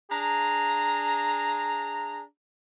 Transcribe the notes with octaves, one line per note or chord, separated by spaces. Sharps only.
D4 G#4 A#5